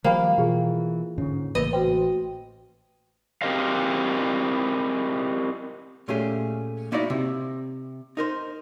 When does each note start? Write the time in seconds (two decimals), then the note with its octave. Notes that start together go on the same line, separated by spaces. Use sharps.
0.04 D#3 F3 G3 A#3 C5 G5 B5
0.38 B2 E3 F4 G#4
1.18 G#2 D3 C#4
1.55 A1 C#3 A#3 B4 D#5
1.73 F#4 B4 C5 G5
3.42 C4 G4 A#4 C5 D#5 F5
6.08 A#2 A3 C#4 G4 G#4
6.92 A#3 D#4 E4 F#4 D5 D#5
7.10 C3
8.17 D#4 A#4 C5